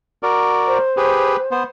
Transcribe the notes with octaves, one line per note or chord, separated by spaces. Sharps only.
F#4 A#4 D5
C5
G4 G#4 B4
B3 C5